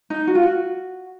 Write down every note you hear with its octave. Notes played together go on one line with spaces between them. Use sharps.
D#4
F#4
F4
F#4